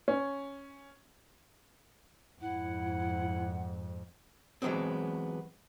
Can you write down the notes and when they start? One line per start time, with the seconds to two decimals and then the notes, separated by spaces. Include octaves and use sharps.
0.08 C#4
2.41 F2 G#2 E4 F#5
4.62 E3 F#3 G#3 B3 C4